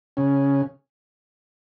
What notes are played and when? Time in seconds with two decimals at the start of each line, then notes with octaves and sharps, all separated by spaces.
0.17 C#3 C#4